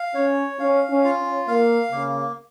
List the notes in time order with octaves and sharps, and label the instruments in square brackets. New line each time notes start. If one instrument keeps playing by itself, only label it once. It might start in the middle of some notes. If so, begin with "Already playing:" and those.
Already playing: [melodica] F5
[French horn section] C#4 [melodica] C#5
[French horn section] C#4 [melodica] F5
[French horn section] C#4
[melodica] F4
[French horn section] C#4
[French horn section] A#3 [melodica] F5
[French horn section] C#3 [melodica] A#3